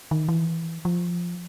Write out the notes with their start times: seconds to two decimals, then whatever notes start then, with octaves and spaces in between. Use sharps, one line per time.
0.11 D#3
0.29 E3
0.85 F3